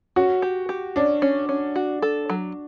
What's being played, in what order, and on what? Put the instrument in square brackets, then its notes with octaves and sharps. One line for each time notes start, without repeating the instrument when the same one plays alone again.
[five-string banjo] C#4 [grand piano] F#4
[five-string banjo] G4
G4
[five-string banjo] C#4 [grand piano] D4
[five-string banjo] C#4
C#4
F#4
A4
F#3